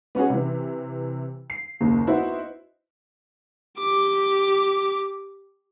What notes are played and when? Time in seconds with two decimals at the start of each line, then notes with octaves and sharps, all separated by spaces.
0.15 B3 C#4 F#4 G#4
0.30 C3 E3
1.50 C7
1.81 F#1 D#2
2.07 B3 D#4 E4 F#4 C5
3.78 G4 D6